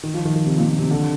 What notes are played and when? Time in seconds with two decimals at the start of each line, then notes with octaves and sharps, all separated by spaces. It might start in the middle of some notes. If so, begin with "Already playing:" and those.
0.03 D#3
0.14 F3
0.25 D#3
0.36 D#3
0.46 C3
0.58 A#2
0.68 A#2
0.79 C3
0.91 D3